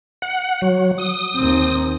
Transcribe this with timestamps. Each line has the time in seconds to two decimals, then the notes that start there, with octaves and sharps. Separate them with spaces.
0.22 F#5
0.62 F#3
0.98 D#6
1.37 D#2 C4